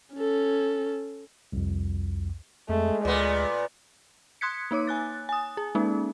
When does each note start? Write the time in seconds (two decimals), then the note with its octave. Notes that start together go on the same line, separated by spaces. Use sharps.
0.14 C#4 A4
1.52 C2 F2
2.69 F2 G#3 A3
3.05 D2 A#2 B3 D5
4.41 C6 D#6 F#6 G#6 B6 C#7
4.71 A#3 D#4 C#5 D6
4.87 G#5 F#6 A6
5.29 G#5 D#6
5.57 G#4
5.75 G#3 A#3 C#4 D#4